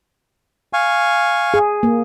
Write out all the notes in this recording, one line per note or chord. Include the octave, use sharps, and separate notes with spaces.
F5 G#5 C#6
G#4
A#3